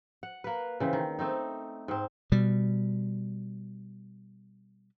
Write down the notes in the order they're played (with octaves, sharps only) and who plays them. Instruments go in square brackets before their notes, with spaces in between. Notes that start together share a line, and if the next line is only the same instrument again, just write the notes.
[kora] F#5
A#3 B4
C#3 E3 C4
D#3
A3 C4 D#4
G#2 C4
[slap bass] B2 G3